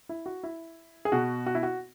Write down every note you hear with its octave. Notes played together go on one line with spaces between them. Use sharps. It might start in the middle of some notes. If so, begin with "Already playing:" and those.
E4
F#4
E4
G#4
B2 F#4
F#4
E4
F#4